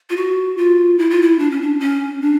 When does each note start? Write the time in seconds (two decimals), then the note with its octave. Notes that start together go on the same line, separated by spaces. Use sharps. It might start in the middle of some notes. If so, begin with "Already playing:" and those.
0.10 F4
0.17 F#4
0.57 F4
0.99 E4
1.10 F4
1.22 E4
1.39 D4
1.51 C#4
1.62 D4
1.80 C#4
2.22 D4